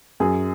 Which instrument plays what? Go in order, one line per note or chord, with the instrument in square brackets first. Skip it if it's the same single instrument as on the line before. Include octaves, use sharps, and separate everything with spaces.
[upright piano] F#2 G#4